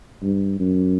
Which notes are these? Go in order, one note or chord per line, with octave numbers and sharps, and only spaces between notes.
G2
F#2